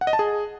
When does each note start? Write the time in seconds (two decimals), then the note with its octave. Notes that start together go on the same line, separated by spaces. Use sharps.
0.01 F#5
0.07 D#5
0.13 A5
0.19 G#4